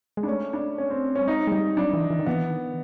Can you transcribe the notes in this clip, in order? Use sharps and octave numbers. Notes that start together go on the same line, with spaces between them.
G#3
D4
A3 C#4
D4
C#4
C4
G3 C#4
G#3 D#4
G#3
G3 D#4
F#3 D4
E3
E3
D#3
E3 B3
D#3